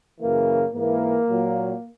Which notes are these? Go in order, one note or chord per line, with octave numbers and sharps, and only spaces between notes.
F#2 C#3 E3 A#3
G#2 E3 A#3
A#2 F#3